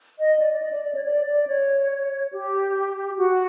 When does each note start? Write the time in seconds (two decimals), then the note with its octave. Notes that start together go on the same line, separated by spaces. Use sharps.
0.19 D#5
0.40 D5
0.53 D5
0.62 D#5
0.72 D5
0.84 D5
0.94 C#5
1.04 D5
1.26 D5
1.48 C#5
2.32 G4
3.18 F#4